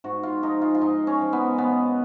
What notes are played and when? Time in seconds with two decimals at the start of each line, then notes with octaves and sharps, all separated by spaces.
0.04 G#2 F#4
0.23 F4
0.43 F3 G#3 D#4
0.61 F4
0.75 F4
0.81 G#2 D#4
1.07 C#4
1.19 F3 G#3
1.33 B3
1.58 B2 B3